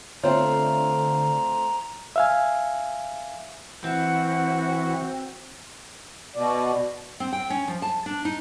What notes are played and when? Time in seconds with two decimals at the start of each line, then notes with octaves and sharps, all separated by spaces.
0.24 D3 A3 C4 F4 C#5 A#5
2.16 E5 F5 G#5
3.84 E3 C4 F#4 F#5
6.35 B2 D5
7.20 C4
7.33 G5
7.50 C#4
7.68 F3
7.82 A5
8.06 D4
8.25 D#4